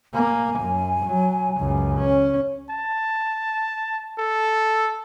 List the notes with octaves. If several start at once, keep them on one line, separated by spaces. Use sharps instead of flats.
A#3 G#5
F#2
F#3
C#2 F#2
C#4
A5
A4